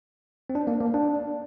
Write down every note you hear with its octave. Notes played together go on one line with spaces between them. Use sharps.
C4
D4
A#3
A#3
D4